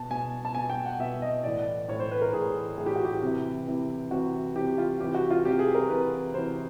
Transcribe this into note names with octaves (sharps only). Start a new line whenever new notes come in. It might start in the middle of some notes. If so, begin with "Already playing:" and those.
Already playing: B2 A5
B2 G#5
A5
B2 G#5
G5
F#5
B2 E5
D#5
A2 E3 D5
A2 E3 C#5
C5
B4
A#4
A2 E3 G#4
A2 E3 G#4
G4
F#4
G4
C3 E3
C3 E3
C3 E3 F#4
C3 E3 G4
F4
C3 E3 G4
F#4
F4
C3 E3 G4
G#4
A#4
C3 E3 B4
C3 E3 C5